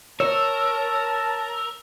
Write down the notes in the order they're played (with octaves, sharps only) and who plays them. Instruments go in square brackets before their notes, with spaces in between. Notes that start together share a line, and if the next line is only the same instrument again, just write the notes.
[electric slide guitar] A#4 [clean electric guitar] C#5 [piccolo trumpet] A5 [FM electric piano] E6